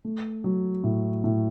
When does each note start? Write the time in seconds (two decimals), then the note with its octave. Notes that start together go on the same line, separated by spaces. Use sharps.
0.05 A3
0.44 F#3
0.84 A2
1.24 A2